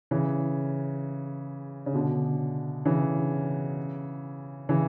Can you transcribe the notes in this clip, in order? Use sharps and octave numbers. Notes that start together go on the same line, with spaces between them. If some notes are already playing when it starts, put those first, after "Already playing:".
C#3 E3
C#3
B2 D3
C#3 E3
C#3 E3